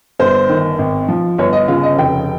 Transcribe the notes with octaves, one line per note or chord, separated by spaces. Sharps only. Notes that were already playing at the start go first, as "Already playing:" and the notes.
G1 C5
D#3
G#1
F3
G1 C#5
D#5
C#3 F4
D#5
F1 G5